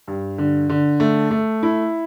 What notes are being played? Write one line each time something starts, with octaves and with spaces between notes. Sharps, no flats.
G2
D3
D3
A3
A3
E4